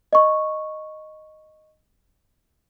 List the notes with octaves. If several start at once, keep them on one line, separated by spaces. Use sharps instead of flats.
D#5 C#6